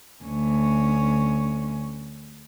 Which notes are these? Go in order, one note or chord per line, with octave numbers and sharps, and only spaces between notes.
D2 C#4